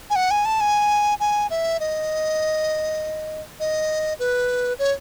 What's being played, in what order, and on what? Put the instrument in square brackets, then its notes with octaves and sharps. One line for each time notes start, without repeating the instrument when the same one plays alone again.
[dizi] G#5
F#5
G#5
A5
G#5
G#5
E5
D#5
D#5
B4
C#5